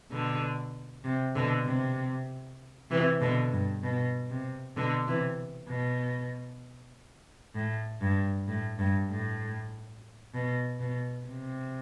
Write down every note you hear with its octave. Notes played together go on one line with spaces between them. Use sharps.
B2 D3
C3
B2 D3
C3
C3 E3
B2 D3
G2
B2
C3
B2 D3
C3 E3
B2
A2
G2
A2
G2
A2
B2
B2
C3